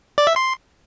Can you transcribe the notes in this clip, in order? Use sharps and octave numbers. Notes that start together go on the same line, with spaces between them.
D5
E5
C6